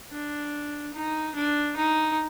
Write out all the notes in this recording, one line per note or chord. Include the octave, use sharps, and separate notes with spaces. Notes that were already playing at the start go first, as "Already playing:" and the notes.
D4
D#4
D4
D#4